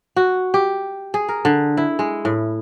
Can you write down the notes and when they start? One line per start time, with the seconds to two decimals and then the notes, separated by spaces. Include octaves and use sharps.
0.16 F#4
0.54 G4
1.14 G#4
1.28 A#4
1.45 D3
1.77 E4
1.99 G#3
2.25 A2